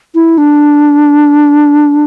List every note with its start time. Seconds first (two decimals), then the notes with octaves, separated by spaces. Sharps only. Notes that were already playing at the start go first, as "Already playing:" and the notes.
0.15 E4
0.38 D4